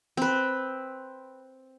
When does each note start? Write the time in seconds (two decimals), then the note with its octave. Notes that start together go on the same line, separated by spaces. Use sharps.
0.17 C4 B4